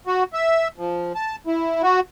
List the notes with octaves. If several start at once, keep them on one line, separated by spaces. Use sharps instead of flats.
F#4
E5
F3
A5
E4
F#4